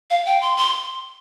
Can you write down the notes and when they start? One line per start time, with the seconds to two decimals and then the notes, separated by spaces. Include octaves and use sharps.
0.10 F5
0.26 G5
0.41 C6
0.57 C6